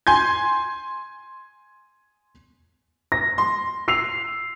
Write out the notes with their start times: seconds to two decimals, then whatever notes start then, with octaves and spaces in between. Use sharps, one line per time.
0.07 G#5 C6 G6 G#6
3.12 A#6
3.38 C6
3.88 E6 C7 F7